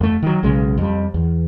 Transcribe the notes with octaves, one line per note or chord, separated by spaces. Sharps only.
F2 A3
D#3 F#3
B1 C#3 G#3
F2 G3
E2